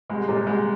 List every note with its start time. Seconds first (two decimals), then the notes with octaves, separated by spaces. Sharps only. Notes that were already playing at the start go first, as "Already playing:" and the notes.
0.10 C2 G#3
0.28 A#2 G#3
0.47 C2 G#3